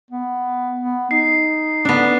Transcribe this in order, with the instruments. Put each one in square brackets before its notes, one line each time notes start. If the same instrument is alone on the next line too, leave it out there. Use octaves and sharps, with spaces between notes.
[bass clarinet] B3
B3
[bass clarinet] D#4 [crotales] C7
[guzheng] B3 D4